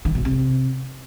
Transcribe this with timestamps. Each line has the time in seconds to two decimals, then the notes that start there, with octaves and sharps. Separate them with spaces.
0.05 D#3
0.15 B2
0.25 C3